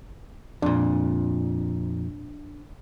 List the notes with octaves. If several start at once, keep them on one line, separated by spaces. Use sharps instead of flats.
F2 A#2 D4